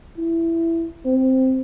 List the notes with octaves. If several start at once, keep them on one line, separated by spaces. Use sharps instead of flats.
E4
C4